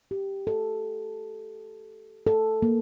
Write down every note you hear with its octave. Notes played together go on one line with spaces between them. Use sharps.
G4
A4
A4
A#3